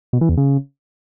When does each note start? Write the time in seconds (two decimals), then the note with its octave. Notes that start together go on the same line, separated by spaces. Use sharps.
0.13 B2
0.21 E3
0.29 E2
0.37 C#3